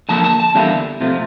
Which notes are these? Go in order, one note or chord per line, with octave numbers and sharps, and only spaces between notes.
D3 F3 A#3 A5
A5
A5
E2 D3 G3 A#3 E4
C3 F3 A3